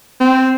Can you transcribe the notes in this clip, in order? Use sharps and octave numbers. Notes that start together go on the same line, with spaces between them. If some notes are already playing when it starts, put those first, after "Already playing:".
C4